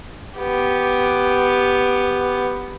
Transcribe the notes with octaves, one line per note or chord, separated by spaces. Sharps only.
B3 G4